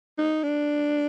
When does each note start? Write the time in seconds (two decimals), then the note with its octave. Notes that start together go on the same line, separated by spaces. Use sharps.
0.18 D#4
0.43 D4